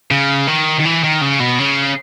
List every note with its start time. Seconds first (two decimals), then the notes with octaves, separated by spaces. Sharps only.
0.11 C#3
0.47 D#3
0.79 D#3
0.85 E3
1.04 D#3
1.22 C#3
1.40 B2
1.59 C#3